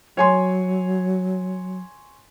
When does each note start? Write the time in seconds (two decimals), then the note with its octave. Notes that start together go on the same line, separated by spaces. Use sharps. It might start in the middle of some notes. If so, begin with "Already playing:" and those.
0.17 F#3 C#5 G#5 C6